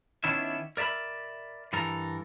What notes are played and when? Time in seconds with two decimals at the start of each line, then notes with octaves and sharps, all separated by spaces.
0.24 D#3 B3 C#4 D4 E4 E5
0.77 A#4 D5 E5 A#5 B5
1.73 G2 E3 A4 A#4